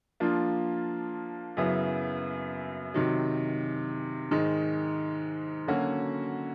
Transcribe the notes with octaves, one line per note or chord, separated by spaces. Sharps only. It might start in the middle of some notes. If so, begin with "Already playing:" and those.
F3 A#3 D4 F4
F#2 C#3 F#3 B3 E4
C3 D#3 F#3
G#2 D#3 G#3
D3 F#3 A#3 C#4 F#4